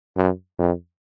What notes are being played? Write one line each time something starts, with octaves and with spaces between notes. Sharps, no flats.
F#2
F2